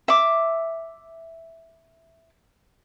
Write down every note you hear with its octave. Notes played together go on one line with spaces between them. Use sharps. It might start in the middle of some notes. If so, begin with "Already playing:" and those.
E5 D6